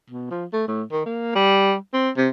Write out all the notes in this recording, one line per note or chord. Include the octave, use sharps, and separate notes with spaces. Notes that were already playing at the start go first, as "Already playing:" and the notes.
B2
F3
A3
A2
D#3
A#3
G3
C4
C3